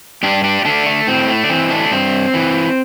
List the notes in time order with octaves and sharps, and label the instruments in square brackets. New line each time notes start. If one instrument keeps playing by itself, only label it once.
[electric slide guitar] G2 D4 G4
D4 G4
D3 A3 D4
A3
A2 C4
A3
D4
E3 C4
A3 D4
G2 C4
E3